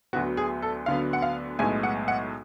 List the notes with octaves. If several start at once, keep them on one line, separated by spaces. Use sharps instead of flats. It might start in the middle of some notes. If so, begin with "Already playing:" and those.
D2 D3 F#3 B3 F#4
G#4
A4
D2 D3 F#3 B3 F5
F#5
F5
B1 A2 G#3 B3 G#5
F#5
F#5